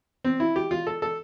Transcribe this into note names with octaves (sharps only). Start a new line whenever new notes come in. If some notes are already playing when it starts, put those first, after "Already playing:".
C4
E4
G4
F4
A4
A4